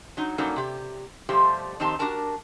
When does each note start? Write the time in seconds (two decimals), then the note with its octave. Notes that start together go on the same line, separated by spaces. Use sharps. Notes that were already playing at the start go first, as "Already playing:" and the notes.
0.17 F#3 D#4
0.38 F#3 G3 A#3 C#4 D#4 A4
0.56 C3 G4
1.29 B2 F3 G3 A3 G4 C5
1.80 F2 D#3 C4 D#4 G4 A5
1.99 D4 F#4 G4 A#4 A5